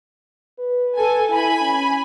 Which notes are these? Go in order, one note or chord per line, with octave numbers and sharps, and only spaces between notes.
B4
A4 G#5
E4 G#5 B5
C#4